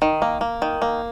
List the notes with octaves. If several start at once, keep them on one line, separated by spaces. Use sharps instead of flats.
D#3
A#3
A#3
D#3
A#3